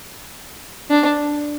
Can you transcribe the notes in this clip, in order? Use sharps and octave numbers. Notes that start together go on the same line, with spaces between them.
D4